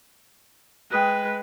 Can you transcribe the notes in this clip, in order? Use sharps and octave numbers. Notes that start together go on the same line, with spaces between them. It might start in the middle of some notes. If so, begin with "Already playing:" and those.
G#3 B4 G5 D#6 F#6